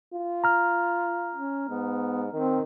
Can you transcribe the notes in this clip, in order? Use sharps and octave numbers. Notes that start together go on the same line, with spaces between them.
F4
A#5 F6
C#4
G#2 B3
D#3 C4